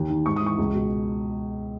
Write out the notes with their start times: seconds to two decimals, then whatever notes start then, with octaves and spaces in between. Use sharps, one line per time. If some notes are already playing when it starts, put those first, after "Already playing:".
Already playing: D#2
0.10 D#3
0.26 G#2 C#6
0.36 D#6
0.42 E3 C#6
0.58 C#2
0.74 B2